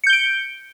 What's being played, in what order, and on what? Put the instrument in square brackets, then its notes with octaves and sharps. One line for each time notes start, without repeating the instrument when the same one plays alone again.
[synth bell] C#7
G6
G7
D7